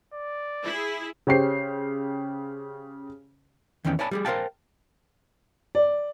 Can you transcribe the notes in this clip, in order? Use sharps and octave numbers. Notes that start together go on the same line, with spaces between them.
D5
E4 G#4
C#3 C#4 G4 C5 C7
E2 D#3 E3 C#4 G5
C#5 D5 G#5 A5 B5
G3 G4 G#4
A#4 C5 E5 F5 G5 A5
D5